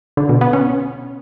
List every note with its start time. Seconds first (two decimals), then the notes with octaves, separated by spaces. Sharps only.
0.17 D3
0.29 B2
0.41 B3
0.53 C#4